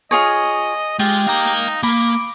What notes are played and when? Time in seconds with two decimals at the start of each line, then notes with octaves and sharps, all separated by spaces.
0.11 F4 G#4 C#5 D#5
0.99 G#3 F4 G4
1.27 D#4 F5 A#5
1.83 A#3 B5 D6